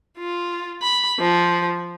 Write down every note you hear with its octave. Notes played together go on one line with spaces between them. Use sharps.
F4
B5
F3